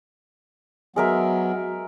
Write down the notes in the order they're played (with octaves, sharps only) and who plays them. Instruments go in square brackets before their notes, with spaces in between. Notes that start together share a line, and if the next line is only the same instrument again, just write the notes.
[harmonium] F#3 B3 [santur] G#3 A#4 E5